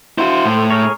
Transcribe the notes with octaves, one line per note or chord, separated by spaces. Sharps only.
E4 F#4 C5
A2
G#4 A#4 C#5